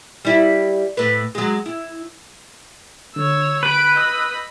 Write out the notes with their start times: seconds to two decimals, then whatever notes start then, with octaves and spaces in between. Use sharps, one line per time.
0.25 G3 E4
0.97 A2 B4
1.35 F#3 G#3
1.66 E4
3.16 D3 C#5 E6
3.63 B4 B5 D7
3.96 D#5 B5 D#6 E6 G6